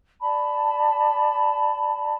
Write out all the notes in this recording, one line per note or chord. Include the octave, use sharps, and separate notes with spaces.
D5 A5 B5